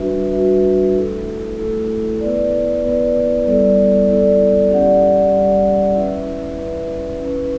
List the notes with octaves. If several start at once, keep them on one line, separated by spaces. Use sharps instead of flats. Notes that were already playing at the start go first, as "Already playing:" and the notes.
Already playing: G3 D4 F#4 B4 E5
G3 D4 F#4 B4 E5
A3 E4 A4
A3 E4 A4
B3 E4 B4 D5
B3 E4 B4 D5
G3 B3 E4 A4 D5
G3 B3 E4 A4 D5
G3 C#4 G4 D5 F#5
G3 C#4 G4 D5 F#5
C#4 E4 B4 E5
C#4 E4 B4 E5
C#4 E4 B4